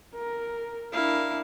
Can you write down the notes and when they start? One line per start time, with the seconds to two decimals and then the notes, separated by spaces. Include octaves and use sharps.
0.15 A#4
0.92 D4 E4 A#4 F5